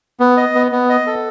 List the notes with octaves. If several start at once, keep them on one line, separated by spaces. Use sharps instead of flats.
B3
D#5
B3
B3
D#5
A4